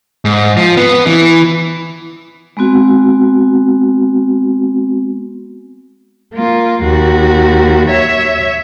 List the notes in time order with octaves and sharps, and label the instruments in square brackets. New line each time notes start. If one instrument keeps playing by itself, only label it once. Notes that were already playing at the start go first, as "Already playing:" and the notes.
[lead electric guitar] G#2
F3
B3
E3
[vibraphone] G#3 B3 C4 F#4
[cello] A#3 F4
D#2 F#4
C#5 E5